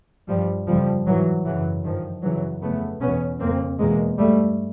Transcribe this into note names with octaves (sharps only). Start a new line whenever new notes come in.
G2 F3 G3
F2 C#3 F3 G3
G#2 E3 F#3
F#2 C#3 E3 F#3
G2 D#3 F3
F#2 C#3 E3 F#3
F2 C#3 A3 B3
E2 B2 B3 C#4
F2 C#3 A#3 C4
E2 B2 G#3 A#3
G2 G3 A3